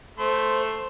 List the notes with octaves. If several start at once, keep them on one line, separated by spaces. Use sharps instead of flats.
A3 C5 C6